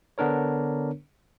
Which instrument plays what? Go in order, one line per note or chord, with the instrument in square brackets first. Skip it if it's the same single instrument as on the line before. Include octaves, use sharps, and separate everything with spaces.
[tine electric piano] D3 B3 D4 A#4 C#5